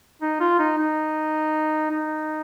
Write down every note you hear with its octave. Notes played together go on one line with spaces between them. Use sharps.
D#4
F4
D#4
D#4
D#4